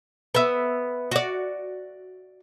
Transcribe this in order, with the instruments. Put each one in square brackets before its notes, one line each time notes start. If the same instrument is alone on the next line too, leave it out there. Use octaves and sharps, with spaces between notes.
[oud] B3 E5
F#4 D5